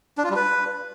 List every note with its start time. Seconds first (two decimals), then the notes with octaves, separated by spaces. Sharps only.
0.18 D4
0.24 F4
0.30 G3
0.36 B4